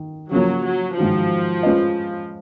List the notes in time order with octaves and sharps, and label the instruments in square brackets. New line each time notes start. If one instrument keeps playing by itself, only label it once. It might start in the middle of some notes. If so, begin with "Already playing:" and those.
Already playing: [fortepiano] D#3
[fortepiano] C#3 F3 A#3 [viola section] F#3
[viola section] F#3
[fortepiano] G#2 D#3 F#3 [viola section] F3
[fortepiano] G#3 C#4 F4 B4 D#5